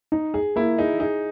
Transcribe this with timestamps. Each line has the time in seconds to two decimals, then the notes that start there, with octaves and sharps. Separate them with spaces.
0.12 D#4
0.34 G#4
0.56 A#3 E4
0.78 D#4 G#4
1.00 D#4 G#4